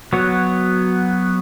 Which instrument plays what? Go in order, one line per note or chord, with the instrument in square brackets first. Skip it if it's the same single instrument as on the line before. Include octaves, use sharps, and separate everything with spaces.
[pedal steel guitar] F#3 B3 F#4 C#5